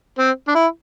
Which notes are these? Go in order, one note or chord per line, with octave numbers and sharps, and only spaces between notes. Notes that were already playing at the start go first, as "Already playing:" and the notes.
C4
D4
E4